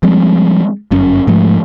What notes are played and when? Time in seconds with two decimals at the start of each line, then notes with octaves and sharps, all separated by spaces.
0.03 F3 G3 G#3 C4
0.91 G1 F#2 C#4
1.27 G#2 F3 G#3 A3